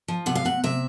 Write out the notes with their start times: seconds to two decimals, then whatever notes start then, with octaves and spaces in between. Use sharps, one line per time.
0.08 F3
0.26 C3 F#5
0.35 F5
0.45 C3 F#5
0.64 C3 E5